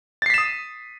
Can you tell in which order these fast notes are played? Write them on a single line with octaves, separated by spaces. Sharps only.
A6 C7 B6 E7 D#6